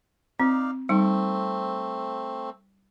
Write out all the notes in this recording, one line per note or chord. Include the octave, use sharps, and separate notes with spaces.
C4 D#4 D5 F5
G3 A3 C4 D#4